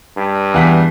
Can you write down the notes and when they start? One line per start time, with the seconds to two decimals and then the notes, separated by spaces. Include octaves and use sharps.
0.17 G2
0.54 E2 F#5 B6